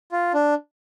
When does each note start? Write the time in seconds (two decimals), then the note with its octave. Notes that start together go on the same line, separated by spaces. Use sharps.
0.12 F4
0.34 D4